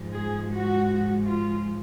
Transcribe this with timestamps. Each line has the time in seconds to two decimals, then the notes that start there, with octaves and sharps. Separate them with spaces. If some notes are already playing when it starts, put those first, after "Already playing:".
Already playing: G#2 F3 G#3
0.13 G#4
0.50 F#4
1.24 F4